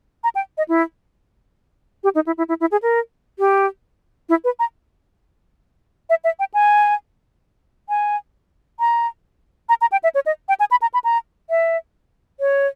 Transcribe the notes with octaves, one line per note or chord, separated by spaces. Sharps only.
A#5
G5
D#5
E4
G4
D#4
E4
E4
E4
E4
G#4
A#4
G4
E4
B4
A#5
E5
E5
G5
G#5
G#5
A#5
A#5
A#5
G5
E5
C#5
D#5
G5
G#5
B5
A#5
B5
A#5
E5
C#5